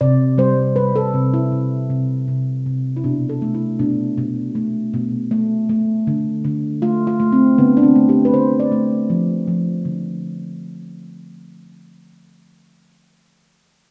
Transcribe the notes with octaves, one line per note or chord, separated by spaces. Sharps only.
C3 D5
G3 C5
G3 B4
A4
C3
E4
C3
C3
C3
C3
E4
B2 D4
A4
A3
E4
B2 D4
B2
A3
B2
A3
A3
D3
D3
A3 F4
F4
A3
C4
D3 B3
D4
C4
A3
G4
B4
D3 C5
D5
A3
F3
F3
D3